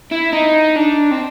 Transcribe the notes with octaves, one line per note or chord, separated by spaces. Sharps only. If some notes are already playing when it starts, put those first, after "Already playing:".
E4
D#4
D4
C4